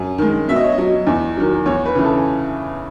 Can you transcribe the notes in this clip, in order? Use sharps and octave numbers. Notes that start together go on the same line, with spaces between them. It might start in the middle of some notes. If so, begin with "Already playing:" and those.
Already playing: F#2
D#3 G#3
B2 E5
D#5
C#5
D#5
F#3
E2
D#3 F#3
E2 C#5
B4
C#3 E3
A4